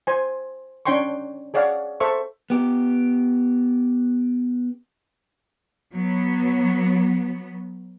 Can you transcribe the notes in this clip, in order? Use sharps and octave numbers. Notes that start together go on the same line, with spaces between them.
C5 G#5
C#4 D4 C#5 G5 C6 C#6
G#4 C#5 D5 F5 F#5
A4 C5 E5 C#6
B3 G4
F#3 B3